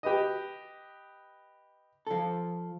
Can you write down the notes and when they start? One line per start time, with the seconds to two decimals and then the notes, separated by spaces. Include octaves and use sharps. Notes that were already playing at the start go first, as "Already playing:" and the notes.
0.03 G4 B4 D#5
2.07 F3 A4